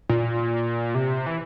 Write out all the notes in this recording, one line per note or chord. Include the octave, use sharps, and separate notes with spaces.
A#2
C3
E3